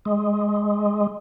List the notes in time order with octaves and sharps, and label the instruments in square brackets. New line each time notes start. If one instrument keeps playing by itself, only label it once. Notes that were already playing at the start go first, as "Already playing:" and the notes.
[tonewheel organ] G#3